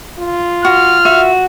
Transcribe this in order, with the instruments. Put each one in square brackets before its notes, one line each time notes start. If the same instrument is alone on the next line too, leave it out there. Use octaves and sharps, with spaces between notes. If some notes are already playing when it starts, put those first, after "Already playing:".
[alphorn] F4
[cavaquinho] F#4 [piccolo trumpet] F6
[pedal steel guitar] F#4 [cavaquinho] E5